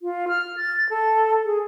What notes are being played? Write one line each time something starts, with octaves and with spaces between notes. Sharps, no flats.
F4
F6
A6
A4
G#4